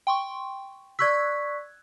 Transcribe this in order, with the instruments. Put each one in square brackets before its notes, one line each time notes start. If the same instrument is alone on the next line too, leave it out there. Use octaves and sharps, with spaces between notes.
[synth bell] G5 C6 C#6
[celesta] D5 C#6 B6 [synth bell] E6 F#6 G#6